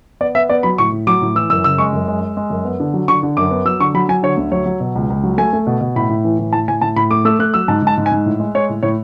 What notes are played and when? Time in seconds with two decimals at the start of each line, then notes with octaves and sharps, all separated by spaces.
0.21 B3 D5
0.35 B3 E5
0.49 B3 D5
0.63 F#3 B5
0.78 A2 C#6
0.92 A2
1.07 F#3 D6
1.21 A2
1.35 E3 E6
1.50 F#2 E6
1.64 C#3 E6
1.78 G#3 C#6
1.93 F#2
2.08 G#3
2.21 G#3
2.37 G#3
2.50 F#2
2.65 B3
2.80 D3
2.94 F#3
3.08 D3 C#6
3.23 D3
3.37 F#2 D6
3.51 B3
3.65 F#3 E6
3.80 D3 C#6
3.94 F#3 B5
4.09 F#3 G#5
4.23 D3 C#5
4.37 D2
4.52 F#3 C#5
4.66 F#3
4.80 B2
4.95 C#2
5.10 C#2
5.23 F#3
5.38 A3 G#5
5.53 A3
5.67 B2
5.81 B2
5.96 A2 B5
6.09 A2
6.24 E3
6.39 A2
6.53 A2 A5
6.68 A2 G#5
6.81 A2 A5
6.96 A2 B5
7.11 A3 D6
7.25 A3 E6
7.39 A3 F#6
7.54 F#3 E6
7.68 G#2 A5
7.82 G#2 A5
7.97 G#2
8.06 G#5
8.11 G#2
8.26 A2
8.40 G#3
8.55 G#3 C#5
8.69 A2
8.83 A2 C#5